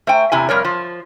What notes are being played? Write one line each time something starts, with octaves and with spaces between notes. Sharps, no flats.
A3 C5 G5 G#5
E2 C3 E4 G#5
F2 G3 A#4 C#5
F3